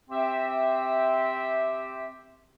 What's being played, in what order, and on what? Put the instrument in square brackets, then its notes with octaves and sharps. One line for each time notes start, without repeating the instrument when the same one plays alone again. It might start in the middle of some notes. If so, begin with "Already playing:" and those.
[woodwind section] C4 G4 E5